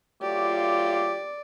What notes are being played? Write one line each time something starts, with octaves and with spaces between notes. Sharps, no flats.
F#3 A3 F4 G4 D5